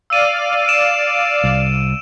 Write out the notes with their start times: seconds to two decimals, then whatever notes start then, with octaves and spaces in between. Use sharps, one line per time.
0.10 D5 F5 E6 D#7
0.68 D7 E7
1.44 C2